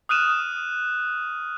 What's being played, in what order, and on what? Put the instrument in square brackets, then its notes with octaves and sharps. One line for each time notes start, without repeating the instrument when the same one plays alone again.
[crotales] D#6 F6 F#6 D#7 E7